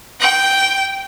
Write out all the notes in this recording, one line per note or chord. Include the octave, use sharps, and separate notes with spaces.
G5